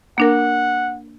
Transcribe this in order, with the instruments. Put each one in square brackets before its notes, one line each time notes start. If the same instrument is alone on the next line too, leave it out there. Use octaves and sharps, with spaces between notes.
[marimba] A#3 D4 A#4 [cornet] F#5